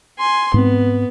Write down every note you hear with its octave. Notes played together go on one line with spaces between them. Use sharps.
G#5 C6
G#2 B3 C4